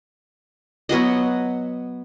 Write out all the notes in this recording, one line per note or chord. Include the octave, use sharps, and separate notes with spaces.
F#3 B3 F#4 D#5